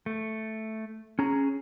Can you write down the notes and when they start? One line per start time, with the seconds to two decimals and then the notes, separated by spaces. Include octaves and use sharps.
0.06 A3
1.19 C#4 G#4 A#5